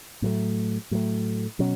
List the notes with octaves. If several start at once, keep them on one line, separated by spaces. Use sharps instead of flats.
A2 F#3 A3
A2 F#3 A3
B2 F#3 C#4